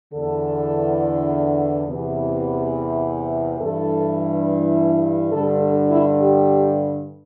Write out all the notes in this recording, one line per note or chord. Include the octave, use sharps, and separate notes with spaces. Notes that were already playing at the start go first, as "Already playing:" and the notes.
E2 D3 A4
E2 C3 E3
G2 E3 A4
G2 D3 A4
A4
E4
G4